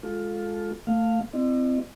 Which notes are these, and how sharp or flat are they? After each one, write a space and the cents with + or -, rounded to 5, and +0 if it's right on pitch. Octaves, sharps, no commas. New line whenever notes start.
G#3 +0 F4 +15 A4 -10
A3 +25 F5 +0
C4 -20 E4 +30 D#5 -45